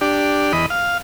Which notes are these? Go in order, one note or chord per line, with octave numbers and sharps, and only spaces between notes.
D4 G4
E2 D#5 B5
F5